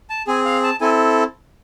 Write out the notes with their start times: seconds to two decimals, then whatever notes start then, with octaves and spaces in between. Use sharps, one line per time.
0.10 A5
0.27 C4 G#4 G#5
0.45 F5
0.63 A5
0.80 C4 E4 A4 G#5